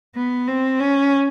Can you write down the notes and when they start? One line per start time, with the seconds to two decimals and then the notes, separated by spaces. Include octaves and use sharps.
0.15 B3
0.47 C4
0.80 C#4